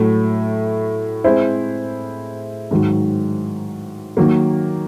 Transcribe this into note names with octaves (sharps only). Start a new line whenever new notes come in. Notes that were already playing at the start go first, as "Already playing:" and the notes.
Already playing: A2 F#3 A3
G#3 C4 E4 G#4 C5
G#2 D#3 F#3
D#3 F#3 A#3